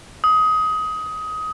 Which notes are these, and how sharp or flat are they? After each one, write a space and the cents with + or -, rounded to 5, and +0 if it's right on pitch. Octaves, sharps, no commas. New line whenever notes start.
D#6 +20